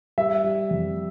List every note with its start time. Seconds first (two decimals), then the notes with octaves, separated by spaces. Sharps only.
0.18 G3 E5
0.44 G3
0.70 F2